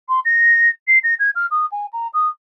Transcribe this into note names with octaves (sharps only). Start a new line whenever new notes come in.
C6
A#6
C7
A#6
G#6
F6
D#6
G#5
A#5
D#6